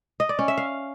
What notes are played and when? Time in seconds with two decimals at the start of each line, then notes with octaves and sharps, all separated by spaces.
0.20 D#5
0.29 D5
0.39 C#4
0.48 E5
0.58 F5